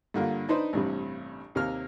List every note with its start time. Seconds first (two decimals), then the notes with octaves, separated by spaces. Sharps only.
0.14 G2 D3 A#3 F4
0.49 D4 D#4 B4 C5
0.73 A1 G2 C3
1.55 D#2 C3 A#3 F6